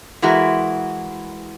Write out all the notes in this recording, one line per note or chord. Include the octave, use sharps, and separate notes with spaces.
E3 G#3 E4 F#4 A#4